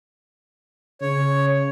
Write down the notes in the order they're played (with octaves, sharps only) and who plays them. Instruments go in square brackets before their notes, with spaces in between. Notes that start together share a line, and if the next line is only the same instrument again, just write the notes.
[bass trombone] C#3 [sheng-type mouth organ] C#5